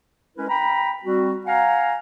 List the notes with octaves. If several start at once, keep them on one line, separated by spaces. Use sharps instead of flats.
G#3 C#4 E4 A#4 B4
G5 A#5 B5
G3 C4 F#4
F5 F#5 G#5 A#5